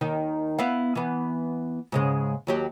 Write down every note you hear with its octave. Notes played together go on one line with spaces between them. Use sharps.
D#2 D#3 D#4
B3 E4 F5
E3 B3
G#2 C#3 G#3
D#2 F#3 G4